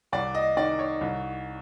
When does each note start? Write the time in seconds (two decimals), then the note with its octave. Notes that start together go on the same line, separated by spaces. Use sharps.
0.12 C2 D5
0.35 D#5
0.57 D#3 D5
0.79 C#5
1.01 C2